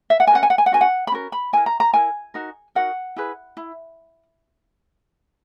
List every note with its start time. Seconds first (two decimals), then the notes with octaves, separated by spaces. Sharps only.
0.10 E5
0.20 F#5
0.27 G#5
0.31 C#4 F#4 A#4 F#5
0.43 G#5
0.50 F#5
0.58 G#5
0.66 F#5
0.72 C#4 F#4 A#4 G#5
0.81 F#5
1.07 B5
1.12 C#4 F#4 A#4
1.32 B5
1.53 E4 A#4 G#5
1.66 A#5
1.80 A#5
1.94 E4 A#4 G#5
2.34 D#4 F#4 A#4
2.75 D#4 F#4 A#4 F#5
3.16 E4 G#4 B4
3.57 E4